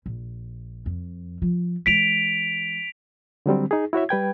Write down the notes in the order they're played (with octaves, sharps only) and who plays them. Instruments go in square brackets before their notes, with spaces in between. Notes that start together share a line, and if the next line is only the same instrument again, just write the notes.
[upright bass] A#1
F2
F3
[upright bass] E3 G#3 [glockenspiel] B6 D7 F7
[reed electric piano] D3 F#3 G3 C4
D#4 G#4
E4 F#4 C#5 E5
G3 B4 G5 G#6